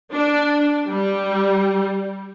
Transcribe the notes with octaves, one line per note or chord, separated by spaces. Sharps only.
D4
G3